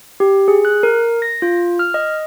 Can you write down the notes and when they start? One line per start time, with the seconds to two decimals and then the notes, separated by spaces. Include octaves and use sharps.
0.20 G4
0.48 G#4
0.65 F#6
0.83 A#4
1.22 A#6
1.42 F4
1.79 F6
1.94 D#5